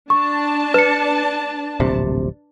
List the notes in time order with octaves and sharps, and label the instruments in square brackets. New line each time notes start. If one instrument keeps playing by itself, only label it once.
[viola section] D4 A5 [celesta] C#6
[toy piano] B4 [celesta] C#7 E7
[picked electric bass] D1 A#1 C3